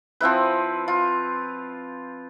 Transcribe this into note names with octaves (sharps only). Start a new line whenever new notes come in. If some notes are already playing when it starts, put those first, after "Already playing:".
F3 C4 E4 B4
F4